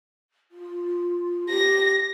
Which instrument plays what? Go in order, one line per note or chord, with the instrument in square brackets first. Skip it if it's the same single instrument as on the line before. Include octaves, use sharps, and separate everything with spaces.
[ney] F4
[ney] G4 [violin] A#6